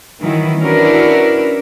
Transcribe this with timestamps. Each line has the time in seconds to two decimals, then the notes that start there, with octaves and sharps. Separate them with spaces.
0.21 D#3 E3 F#3 E4
0.60 C#4 D4 E4 F#4 A#4 B4